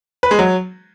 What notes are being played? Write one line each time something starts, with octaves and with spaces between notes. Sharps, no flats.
B4
G#3
F#3